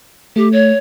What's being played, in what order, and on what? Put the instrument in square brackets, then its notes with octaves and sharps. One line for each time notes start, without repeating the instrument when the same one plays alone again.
[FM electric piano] A3 [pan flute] G4
[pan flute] C#5